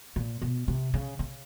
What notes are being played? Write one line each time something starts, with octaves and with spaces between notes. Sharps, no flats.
A#2
B2
C3
C#3
C#3